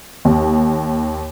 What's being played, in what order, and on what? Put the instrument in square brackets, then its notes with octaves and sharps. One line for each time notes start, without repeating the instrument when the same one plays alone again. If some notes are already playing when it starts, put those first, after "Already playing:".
[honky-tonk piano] D#2